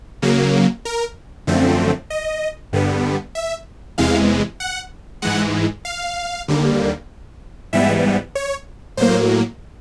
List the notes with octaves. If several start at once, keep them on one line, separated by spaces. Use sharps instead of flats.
C#3 F#3 A#3
A#4
F#2 D3 F3 A3 C4
D#5
G2 D3 G3 B3
E5
E2 C3 E3 G#3 F5
F#5
G#2 E3 G#3 F#5
F5
D#2 D3 G3 A#3
G#2 E3 G3 B3 E5
C#5
A2 F#3 A#3 C5